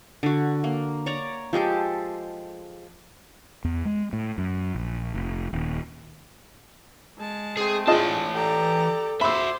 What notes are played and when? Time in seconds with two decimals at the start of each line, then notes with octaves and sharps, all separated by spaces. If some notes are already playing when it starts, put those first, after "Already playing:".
0.23 D3 F#4
0.64 A#3
1.06 C#5 D5 A#5
1.53 F3 G#3 G4 A4
3.64 E2
3.85 G#3
4.13 A2
4.38 F#2
4.75 A#1
5.14 F1
5.53 D#1
7.18 G#3 A5
7.57 A3 C4 G#4
7.87 E3 D4 F4 G#4 D#5 A5
8.34 G4 A4 D5 A#5
9.21 F#4 C5 E5 B5 C6 D6 E6